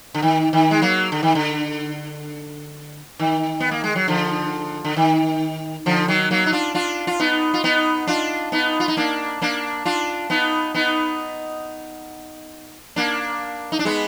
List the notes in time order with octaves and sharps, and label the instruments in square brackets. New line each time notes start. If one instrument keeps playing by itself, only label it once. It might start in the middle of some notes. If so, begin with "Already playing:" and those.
[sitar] D3
D#3
D#3
G#3
F#3 A#3
D3
D#3
D3
D#3
B3
A#3
G#3
F#3
D3 F3
D3
D#3
D3 F3
D#3 F#3
F#3 A#3
D#4
D4 F4
D4 F4
F4
B3 D#4
F4
B3 D#4
D4 F4
B3 D#4
F4
D#4
A#3 D4
A#3 D4
D4 F4
B3 D#4
B3 D#4
A#3 D4
D#4
D4
G#3 B3